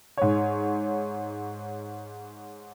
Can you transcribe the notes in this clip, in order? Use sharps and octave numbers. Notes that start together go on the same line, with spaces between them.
G#2 C#5